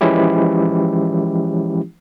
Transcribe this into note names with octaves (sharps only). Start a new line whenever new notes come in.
E3 F3 G#3 C#4 E4 G4